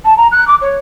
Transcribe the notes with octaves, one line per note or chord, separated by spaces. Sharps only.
A5
A#5
F#6
D6
C#5